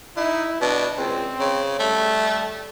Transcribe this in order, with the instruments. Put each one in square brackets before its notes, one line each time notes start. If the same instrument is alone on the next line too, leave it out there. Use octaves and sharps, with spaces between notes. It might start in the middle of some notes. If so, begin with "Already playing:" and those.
[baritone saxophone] D#4 [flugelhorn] E4
[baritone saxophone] B2 [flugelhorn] D4
[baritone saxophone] C#2 [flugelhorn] C4
[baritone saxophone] C#3
[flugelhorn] G3 [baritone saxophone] A3